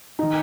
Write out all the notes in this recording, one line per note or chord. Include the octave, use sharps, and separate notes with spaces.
D#3 D#4